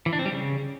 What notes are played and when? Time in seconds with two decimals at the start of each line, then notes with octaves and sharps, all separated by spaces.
0.06 E3
0.13 D4
0.19 C4
0.26 G3
0.32 C#3